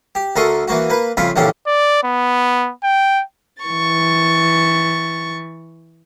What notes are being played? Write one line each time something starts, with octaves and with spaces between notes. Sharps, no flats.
G4
D2 A4 A#4 C6 C#6 D#6
E3 A#3 F#4
A#3 B4
F2 C#3 F4 E5 B5
A#1 E2 C#3 G4 A4
D5
B3
G5
E3 C#6 A6